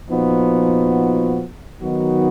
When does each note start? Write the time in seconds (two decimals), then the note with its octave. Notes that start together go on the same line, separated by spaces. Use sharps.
0.10 A#2 F3 B3 D#4 F#4
1.79 D#3 F#3 B3 D#4 F#4